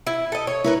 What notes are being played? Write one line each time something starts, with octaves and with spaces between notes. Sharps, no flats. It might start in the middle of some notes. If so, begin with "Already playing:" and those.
E4
A4 D#5
C#5
E4 A#4 B4